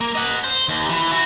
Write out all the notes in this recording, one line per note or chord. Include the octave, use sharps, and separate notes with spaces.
A#3
D#5 F#5
C5
D#2
E3
E4 F#4